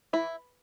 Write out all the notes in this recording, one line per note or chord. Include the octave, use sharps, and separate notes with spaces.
E3 E4